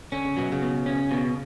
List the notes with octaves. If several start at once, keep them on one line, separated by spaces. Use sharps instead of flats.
D3 C#4
C#3
B2 F#3
C#3
B2
C#4
B2